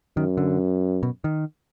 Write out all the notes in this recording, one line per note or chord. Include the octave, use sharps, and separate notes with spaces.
F#2 D#3
D3
B2
D#3